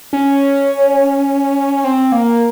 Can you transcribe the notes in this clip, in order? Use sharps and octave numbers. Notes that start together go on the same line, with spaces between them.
C#4
C4
A#3